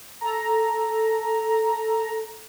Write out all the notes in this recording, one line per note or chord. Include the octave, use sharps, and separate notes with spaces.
A4 A#5